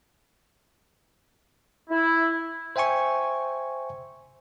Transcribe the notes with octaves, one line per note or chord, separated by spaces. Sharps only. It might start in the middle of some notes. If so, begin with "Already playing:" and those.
E4
C5 E5 G5 G#5 C#6